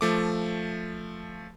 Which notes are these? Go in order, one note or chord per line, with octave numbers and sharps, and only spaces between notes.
F3 A3 D6